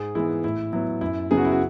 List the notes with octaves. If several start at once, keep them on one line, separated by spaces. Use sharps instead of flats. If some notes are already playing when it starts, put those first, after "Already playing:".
Already playing: G#2 G#4
E3 G#3 B3 E4
A2 E4
F#3 B3 E4
F#2 E4
C#3 F#3 B3 G#4
F#4
E4
F#4